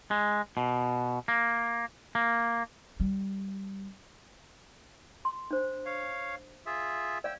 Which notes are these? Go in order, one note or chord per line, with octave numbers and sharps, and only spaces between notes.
G#3
B2
A#3
A#3
G3
C6
D4 C5
C#5 F5
F4 G#4 E5
D5 F5 G5 E6